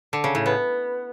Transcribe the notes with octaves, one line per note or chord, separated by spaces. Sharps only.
D3
C#3
A2
B3